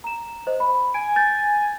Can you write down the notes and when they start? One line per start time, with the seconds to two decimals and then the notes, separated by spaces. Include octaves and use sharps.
0.04 A#5 E7
0.47 C5 D#5
0.60 B5
0.94 G#5 D7
1.16 G6 A6